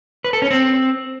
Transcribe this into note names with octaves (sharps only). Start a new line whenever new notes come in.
B4
A4
C#4
C4